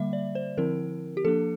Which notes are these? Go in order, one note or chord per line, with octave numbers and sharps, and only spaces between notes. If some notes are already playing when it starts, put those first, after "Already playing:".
Already playing: D3 G3 A#3 E5
D5
C5
D3 F3 C4 E4 A#4
G4
F3 A#3 D4 A4